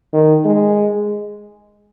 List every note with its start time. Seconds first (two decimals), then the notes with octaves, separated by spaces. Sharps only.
0.13 D#3
0.45 G#3